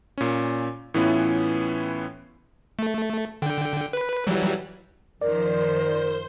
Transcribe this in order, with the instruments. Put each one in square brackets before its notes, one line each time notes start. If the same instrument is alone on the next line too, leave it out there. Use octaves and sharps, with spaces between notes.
[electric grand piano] A#2 C#4
A2 E3 B3 C#4 E4 F4
[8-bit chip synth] A3
D3 G5
B4
E3 F#3 G3
[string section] F#2 D#3 F3 [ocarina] A#4 [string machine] C5 C6 [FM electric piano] D5